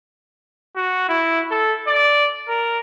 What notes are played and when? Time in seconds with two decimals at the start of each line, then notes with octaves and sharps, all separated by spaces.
0.76 F#4
1.09 E4
1.51 A4
1.87 D5
2.48 A#4